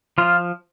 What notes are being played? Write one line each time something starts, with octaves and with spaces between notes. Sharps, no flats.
F3 F4